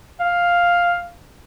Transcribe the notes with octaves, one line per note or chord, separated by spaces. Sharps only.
F5